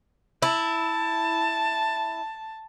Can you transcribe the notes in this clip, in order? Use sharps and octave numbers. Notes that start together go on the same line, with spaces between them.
E4 A5